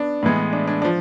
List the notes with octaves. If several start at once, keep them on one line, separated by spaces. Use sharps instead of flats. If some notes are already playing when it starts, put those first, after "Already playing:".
Already playing: B3 D4
A2 E3 G#3 B3
D4
D4
D4
F3